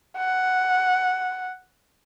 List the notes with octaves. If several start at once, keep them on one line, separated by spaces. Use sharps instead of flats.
F#5